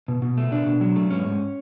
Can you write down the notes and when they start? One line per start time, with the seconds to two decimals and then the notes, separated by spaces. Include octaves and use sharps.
0.08 B2
0.22 B2
0.37 A3
0.51 B2 D4
0.67 B2
0.81 F#3
0.96 A3
1.10 G#2 C#4
1.26 G#2